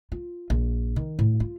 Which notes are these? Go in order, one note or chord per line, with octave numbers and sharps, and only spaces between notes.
F4
A#1
D#3
A2
F4